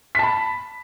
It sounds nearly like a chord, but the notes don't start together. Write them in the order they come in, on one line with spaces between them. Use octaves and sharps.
B6 A5 B5